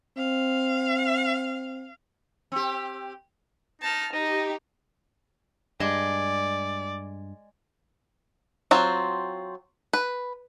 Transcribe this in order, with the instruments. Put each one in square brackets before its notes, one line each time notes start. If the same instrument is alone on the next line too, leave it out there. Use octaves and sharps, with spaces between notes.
[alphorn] C4 [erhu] F5
[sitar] C4 G4
[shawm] D#4 [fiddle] A5 F6
[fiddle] D#4 [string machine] G4 [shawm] D#5
[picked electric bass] G2 [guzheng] G#3 [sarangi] D5
[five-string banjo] F#3 C4 F4
B4